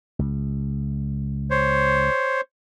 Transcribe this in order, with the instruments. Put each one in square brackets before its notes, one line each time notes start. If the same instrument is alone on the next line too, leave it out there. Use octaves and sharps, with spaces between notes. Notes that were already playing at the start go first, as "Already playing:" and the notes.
[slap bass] C#2
[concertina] C5 C#5